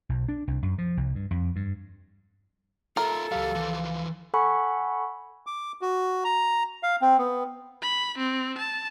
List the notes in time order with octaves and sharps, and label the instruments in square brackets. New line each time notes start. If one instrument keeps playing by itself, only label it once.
[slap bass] B1
D4
C2
F#2
F3
C2
G2
F2
G2
[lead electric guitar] F4 E5 [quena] A4 [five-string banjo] A#4
[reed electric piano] C#2 F5 [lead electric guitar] F#3 G4
[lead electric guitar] E3 F3
[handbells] A4 F#5 G#5 B5 C#6
[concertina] D6
F#4
A#5
F5
C4
B3
[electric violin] B5
C4
A5